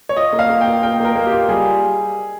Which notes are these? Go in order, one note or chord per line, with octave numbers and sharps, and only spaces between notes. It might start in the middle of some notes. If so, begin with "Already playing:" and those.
C#5
F4 D#5
A#3
F5
A#3
F4 G5
A#3 G5
A#3 A#4
A#3
G4
F4
G3 G#4